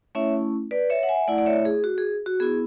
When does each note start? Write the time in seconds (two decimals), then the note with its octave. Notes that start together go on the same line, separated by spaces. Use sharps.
0.15 A3 C#4 E4 C#5 E5
0.71 B4 D5
0.90 C#5 E5
1.03 F#5
1.09 E5 G#5
1.28 A3 E4 D5 F#5
1.38 D5
1.46 C#5 E5
1.65 G#4
1.84 F#4
1.98 G#4
2.26 F#4
2.40 B3 E4 G#4